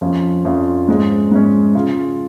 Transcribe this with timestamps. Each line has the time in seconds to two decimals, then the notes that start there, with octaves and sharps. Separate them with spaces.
0.01 F2 F3 C#4 F4
0.45 F2 F3 C#4 F4
0.88 G#2 G#3 C#4
1.31 G#2 G#3 C#4
1.75 C#3 G#3 F4